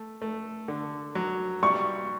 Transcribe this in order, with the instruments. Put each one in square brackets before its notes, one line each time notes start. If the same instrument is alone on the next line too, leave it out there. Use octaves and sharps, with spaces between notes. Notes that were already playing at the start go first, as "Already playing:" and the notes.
Already playing: [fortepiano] A3
A3
D3
F#3
[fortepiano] G3 [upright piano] C#6